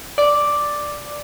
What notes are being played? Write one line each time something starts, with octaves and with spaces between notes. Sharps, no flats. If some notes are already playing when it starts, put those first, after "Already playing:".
D5